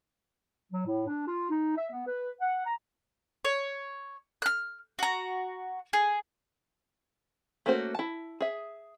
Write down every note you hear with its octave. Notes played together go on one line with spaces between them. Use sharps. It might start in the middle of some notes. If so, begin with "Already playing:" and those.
F#3
A2
D4
F4
D#4
E5
B3
B4
F#5
A#5
C#5
F6 F#6
F#4 A#5
G#4
A3 A#3 C#4 F#4 C5
E4 A5
G#4 E5